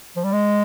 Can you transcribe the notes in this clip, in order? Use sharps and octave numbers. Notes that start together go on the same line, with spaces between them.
F3
G3
G#3